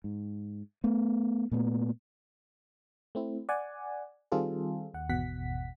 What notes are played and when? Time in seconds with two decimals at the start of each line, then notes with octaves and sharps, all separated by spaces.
0.04 G#2
0.84 A3 B3
1.51 A#2 A3 B3
3.15 A3 C4 E4
3.49 D5 F#5 G#5
4.32 D#3 G3 C4 F4 G#4 A4
4.94 D#2 F#5
5.09 G#1 E2 B2 F#5 B6